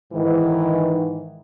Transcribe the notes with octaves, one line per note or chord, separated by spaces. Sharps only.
G#2 D#3 E3